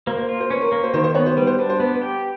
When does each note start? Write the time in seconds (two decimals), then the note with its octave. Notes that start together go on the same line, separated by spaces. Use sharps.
0.07 A#3 C5
0.18 C5
0.29 F4
0.40 C5
0.50 C#4 B4
0.62 A#4
0.72 A#3 A#4
0.83 C5
0.94 D#3 C5
1.04 C5
1.15 B3 C#5
1.26 C5
1.37 G3 B4
1.47 C5
1.59 D4 B4
1.70 C5
1.79 B3 B4
1.94 B4
2.02 G4